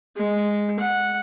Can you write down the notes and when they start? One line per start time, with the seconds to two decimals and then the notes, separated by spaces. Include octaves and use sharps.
0.17 G#3
0.80 F#5